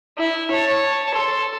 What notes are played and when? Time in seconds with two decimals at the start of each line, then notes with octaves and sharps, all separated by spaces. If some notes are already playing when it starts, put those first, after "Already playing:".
0.18 E4
0.51 C#5 A5
1.14 A4 C6